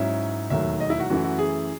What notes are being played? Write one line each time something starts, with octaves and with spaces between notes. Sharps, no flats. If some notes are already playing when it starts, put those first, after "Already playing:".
Already playing: G#2 F#3 C#4 E4 E5
E1 D#2 D#3 F#3 A3 E5
D#5
E4
F#4
F#2 E3 A3 E4 F#4
F#4
G#4